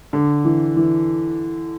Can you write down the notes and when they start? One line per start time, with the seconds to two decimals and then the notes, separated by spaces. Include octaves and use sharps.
0.13 D3
0.45 E3
0.76 E3